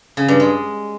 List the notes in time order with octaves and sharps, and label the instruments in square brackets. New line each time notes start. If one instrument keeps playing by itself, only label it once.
[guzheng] C#3
G2
G#3